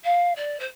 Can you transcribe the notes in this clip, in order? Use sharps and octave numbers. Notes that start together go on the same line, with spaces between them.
F5
D5
C5